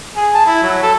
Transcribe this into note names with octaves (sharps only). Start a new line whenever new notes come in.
G#4
A5
E4
F#3
A4